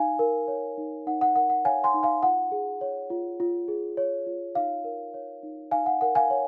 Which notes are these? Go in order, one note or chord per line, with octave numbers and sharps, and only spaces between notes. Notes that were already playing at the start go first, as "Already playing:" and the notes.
Already playing: D#4 F5 G#5
A#4
C#5
D#4
D#4 F#5
F#5
A#4 F#5
F#5
C#5 F5 G#5
G#5 C6
D#4
F5 G#5
F4 F#5
G#4
C#5
F4
F4
G#4
C#5
F4
D#4 F5
A#4
C#5
D#4
D#4 F5 G#5
F#5
A#4 F#5
F5 G#5
C#5